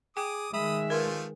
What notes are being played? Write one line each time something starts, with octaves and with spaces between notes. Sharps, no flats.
G#4 G5 D6 D#6
D#3 G#3 E5 B5 D#6
F3 A3 F4 A#4 B4